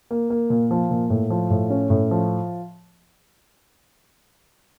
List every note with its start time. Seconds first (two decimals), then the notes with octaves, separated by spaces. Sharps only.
0.11 A#3
0.30 A#3
0.50 A#2
0.71 F3
0.91 A#2
1.10 A2
1.30 F3
1.50 A2
1.70 C#4
1.90 A2
2.11 F3